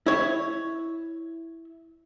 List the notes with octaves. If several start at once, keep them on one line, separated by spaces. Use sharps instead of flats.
E4 C#5